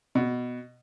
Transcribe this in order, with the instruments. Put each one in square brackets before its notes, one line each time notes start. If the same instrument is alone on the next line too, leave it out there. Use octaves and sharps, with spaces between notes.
[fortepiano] B2